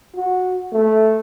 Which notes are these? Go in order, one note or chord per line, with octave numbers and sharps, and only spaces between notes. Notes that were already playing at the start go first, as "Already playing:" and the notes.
F#4
A3